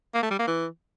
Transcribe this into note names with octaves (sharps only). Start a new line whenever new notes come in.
A#3
A3
G3
A#3
E3